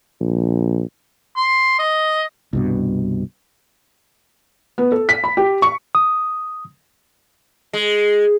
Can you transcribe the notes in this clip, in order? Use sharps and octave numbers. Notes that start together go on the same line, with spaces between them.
A#1
C6
D#5
C2 G2 B2
B3
A4
B6
B5
G4
C#6
D#6
G#3